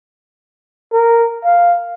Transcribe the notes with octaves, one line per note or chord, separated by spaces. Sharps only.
A#4
F5